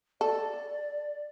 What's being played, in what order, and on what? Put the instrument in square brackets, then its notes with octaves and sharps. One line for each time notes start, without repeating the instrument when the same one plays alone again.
[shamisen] A4 [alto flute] D5